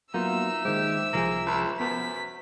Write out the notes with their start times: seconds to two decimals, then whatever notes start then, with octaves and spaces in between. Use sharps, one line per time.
0.14 F#3 A#3 B3 D#4 F4 E5 E6
0.65 D#3 G#3 G4 C5
1.13 C2 F3 A#3 G#4
1.46 C#2
1.80 F#2 B3 B6